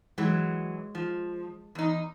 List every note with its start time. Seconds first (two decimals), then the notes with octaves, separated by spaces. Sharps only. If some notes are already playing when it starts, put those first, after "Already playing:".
0.18 E3 F#3 G#3
0.95 F3
1.75 E2 D#4